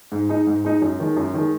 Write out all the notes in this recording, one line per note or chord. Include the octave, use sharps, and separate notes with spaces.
G#2
G#3 D#4
G#2
G#3 D#4
F#2
D#3 G#3
F#2
D#3 G#3